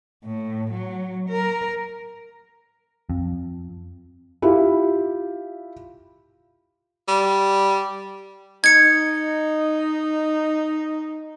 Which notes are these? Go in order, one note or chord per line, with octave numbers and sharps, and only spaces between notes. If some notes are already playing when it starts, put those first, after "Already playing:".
A2
F#3
A#4
F2
E4 F4 G4
G3
D#4 G#6 C#7